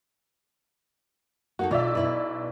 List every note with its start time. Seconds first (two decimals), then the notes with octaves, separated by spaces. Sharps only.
1.59 A#3 D#4 F#4 A4
1.71 B1 F4 D5 E5
1.95 B2 E4 B4